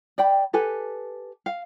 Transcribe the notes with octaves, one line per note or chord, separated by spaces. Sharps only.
D5 G5 B5
G4 A4 B4 G#5
F5